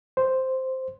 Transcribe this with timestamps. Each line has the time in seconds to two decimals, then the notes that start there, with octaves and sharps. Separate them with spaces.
0.17 C5